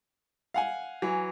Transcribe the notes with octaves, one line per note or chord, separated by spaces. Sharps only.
F5 F#5 G#5
E3 F#3